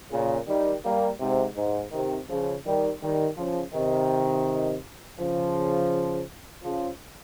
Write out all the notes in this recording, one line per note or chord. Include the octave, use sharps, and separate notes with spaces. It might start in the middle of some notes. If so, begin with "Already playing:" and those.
A#2 C#3
D#3 G3
G3 A#3
G#2 C3
G#2
C3 D#3
C#3 F3
D#3 G3
D#3 G3
C#3 F3
C3 D#3
C#3 F3
C#3 F3